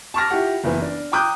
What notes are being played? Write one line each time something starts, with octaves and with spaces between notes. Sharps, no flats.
A5 B5 C#6 D6 F6 A#6
E4 F4 G4 F#5
F#1 E3 B3
D4
G5 A#5 D6 D#6 F#6 G6